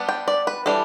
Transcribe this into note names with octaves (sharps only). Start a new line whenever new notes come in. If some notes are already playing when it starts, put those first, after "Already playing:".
Already playing: G3 B3 D4
G5
D5
B4
E3 G3 D4 A4